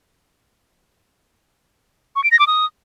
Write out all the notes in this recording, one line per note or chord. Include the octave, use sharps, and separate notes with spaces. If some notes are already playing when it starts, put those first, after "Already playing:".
C#6
D7
A#6
D6
D#6